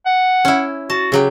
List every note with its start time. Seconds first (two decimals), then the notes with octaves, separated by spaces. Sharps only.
0.06 F#5
0.45 C#4 E4
0.90 F#4 A5
1.12 C#3 F#3 G4